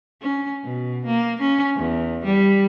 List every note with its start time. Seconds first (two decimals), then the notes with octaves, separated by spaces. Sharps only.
0.21 C#4
0.64 B2
1.06 A#3
1.41 C#4
1.76 E2
2.25 G3